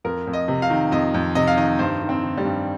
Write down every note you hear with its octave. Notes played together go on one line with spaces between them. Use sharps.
F2 A#4
F2
D#5
C3
F5
D#3
F2 D#5
F2
C3 D#5
F5
D#3 D#5
G2 C5
D#3
C4
D#3
G3
G2